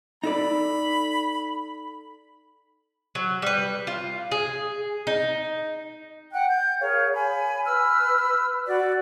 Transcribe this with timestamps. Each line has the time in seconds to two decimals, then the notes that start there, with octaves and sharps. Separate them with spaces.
0.24 D#4 A4 D5 B5
3.15 F#3
3.42 G3 B4
3.87 F4
4.31 G#4
5.07 D#4
6.32 F#5 G5 F#6
6.48 G6
6.80 G#4 A#4 C#5 F5
7.14 G#5 B5
7.65 B4 E6 F6
8.66 F#4 D5